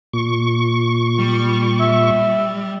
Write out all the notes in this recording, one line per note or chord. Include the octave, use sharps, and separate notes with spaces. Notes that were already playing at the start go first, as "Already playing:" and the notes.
A#2 C#6
G3
E5